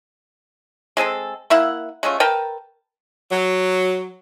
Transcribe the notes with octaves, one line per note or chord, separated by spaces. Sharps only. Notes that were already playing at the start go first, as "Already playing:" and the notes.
G#3 C4 G#4 A4
A#3 E4 E5 F#5
G#3 A3 C#4 F4
A#4 B4 G5 A5
F#3